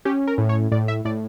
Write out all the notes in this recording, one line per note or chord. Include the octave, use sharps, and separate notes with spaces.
C#4 G4
A#4
A2
C#5
A2 D5
E5
A2 D5